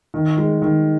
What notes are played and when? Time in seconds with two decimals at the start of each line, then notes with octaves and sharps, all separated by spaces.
0.14 D#3
0.37 G#3
0.62 D#3